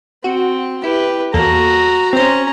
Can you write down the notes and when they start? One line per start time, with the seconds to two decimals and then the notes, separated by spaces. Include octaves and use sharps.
0.24 C4 F#4
0.84 E4 G4 B4
1.34 E2 A#3 F#4 A4 A#5
2.13 C4 C#4 C5 A#5